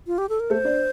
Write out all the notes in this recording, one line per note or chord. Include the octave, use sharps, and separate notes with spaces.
F4
G4
A4
A#4
A3 A4 C5
D4 D5